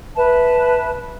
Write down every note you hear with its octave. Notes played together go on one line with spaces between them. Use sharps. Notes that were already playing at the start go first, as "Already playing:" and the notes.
B4 E5 A5